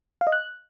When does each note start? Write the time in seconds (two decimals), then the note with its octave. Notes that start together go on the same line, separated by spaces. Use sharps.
0.21 F5
0.27 D#5
0.32 F#6